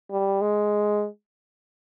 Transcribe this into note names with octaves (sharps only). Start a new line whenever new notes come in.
G3
G#3